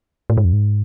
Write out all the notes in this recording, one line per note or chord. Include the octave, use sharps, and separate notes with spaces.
A2
G#2
F2
G#2